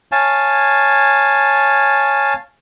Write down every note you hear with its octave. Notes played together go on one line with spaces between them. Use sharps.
C#5 F5 G#5 A5